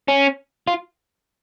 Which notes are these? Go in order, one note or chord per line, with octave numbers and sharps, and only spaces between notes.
C#4
F4